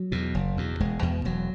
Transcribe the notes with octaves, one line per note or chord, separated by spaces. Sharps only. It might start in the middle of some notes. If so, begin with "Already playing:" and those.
Already playing: F#3
E2 B2
F#1
E2 B2
E1 G#3
E2 B2
E1 F#3